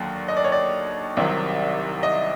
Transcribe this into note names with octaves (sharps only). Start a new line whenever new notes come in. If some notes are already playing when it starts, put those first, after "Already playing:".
Already playing: D#2 D3 F#3
D#5
D5
C#5
D5
C2 C3 D#3 F#3
D#5